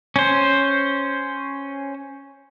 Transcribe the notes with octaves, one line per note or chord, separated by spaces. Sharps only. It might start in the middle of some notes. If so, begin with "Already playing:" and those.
C#4 C5